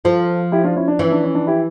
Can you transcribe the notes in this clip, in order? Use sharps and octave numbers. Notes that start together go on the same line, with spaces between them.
F3 F4 A4
E4 G4
D4 F4
C#4 E4
D4
E3 C#4
D4
C#4
D4
E4 G4